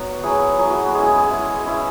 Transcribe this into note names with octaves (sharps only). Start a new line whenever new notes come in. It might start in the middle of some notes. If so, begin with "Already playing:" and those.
Already playing: F#3 B3 C#5 F#5
F#3 E4 G#4
F#3 E4 G#4
F#4 B4
F#4
G#3 C#4 E4 G#4
G#4
G#4
G#3 C#4 E4
G#3 C#4 E4